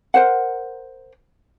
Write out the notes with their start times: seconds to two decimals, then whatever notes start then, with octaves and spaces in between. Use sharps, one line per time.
0.14 A#4 C5 F#5